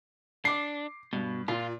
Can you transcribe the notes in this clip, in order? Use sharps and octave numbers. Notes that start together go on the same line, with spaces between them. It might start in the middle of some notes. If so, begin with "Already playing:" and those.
D4 D6 C7
G2 B2
A#2 F4